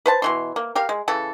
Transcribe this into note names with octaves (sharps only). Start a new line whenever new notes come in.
B4 C5 A5
B2 E3 C6
A#3
G4 A#4 F5
G#3
C#3 E3 A4